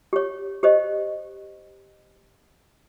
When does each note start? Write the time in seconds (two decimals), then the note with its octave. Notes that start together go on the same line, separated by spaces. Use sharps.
0.13 G4 C#5
0.63 G4 C5 D#5